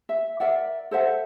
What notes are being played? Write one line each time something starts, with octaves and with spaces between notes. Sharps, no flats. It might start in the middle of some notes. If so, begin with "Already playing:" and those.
E5
A#4 D5 E5 F#5
A4 C5 E5 F#5